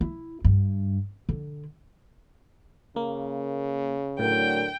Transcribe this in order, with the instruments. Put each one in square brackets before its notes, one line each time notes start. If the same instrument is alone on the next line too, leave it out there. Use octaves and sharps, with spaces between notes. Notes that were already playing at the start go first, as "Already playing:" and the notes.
[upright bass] E4
G2
D3
[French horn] C#3 [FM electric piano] A#3
[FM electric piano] A2 [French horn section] D3 F#3 A#4 [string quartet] G5